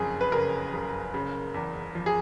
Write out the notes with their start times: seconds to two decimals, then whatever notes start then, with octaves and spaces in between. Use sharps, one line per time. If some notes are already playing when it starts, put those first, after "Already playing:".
Already playing: F#1 F2 G#4
0.21 B4
0.32 C#3 A#4
0.73 F#1
1.14 C#3
1.54 E2
1.95 F3
2.06 G#4